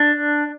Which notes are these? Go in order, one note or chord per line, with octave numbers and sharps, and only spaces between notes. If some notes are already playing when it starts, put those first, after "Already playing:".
Already playing: D4